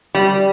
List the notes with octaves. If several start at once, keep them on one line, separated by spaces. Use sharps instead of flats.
G3